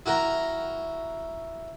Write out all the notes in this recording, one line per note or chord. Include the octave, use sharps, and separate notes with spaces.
E4 F#4 A#4 G5 A#5